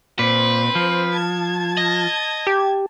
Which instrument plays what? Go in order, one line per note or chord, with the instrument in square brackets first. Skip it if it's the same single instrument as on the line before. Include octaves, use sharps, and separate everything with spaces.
[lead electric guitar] A#2 [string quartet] C4 C5 [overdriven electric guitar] B4
[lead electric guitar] F3
[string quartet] A5 G#6
[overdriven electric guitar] D#5
[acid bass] G4